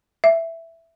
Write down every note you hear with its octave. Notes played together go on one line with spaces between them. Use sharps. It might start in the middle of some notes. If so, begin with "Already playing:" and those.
E5